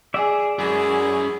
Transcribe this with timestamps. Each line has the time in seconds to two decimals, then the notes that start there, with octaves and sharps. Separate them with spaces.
0.14 G#4 D5 E5
0.59 F#2 G#3 E4 G#4